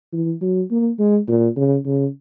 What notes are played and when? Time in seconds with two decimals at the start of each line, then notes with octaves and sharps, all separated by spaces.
0.13 E3
0.42 F#3
0.71 A#3
0.99 G#3
1.28 A#2
1.56 C#3
1.86 C#3